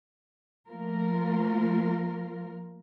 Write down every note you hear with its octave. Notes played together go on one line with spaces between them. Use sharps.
F3 A3 A#3 F4 A#4